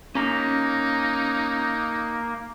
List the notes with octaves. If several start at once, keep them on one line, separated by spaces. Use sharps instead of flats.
A#3 C#4 D#4 A#5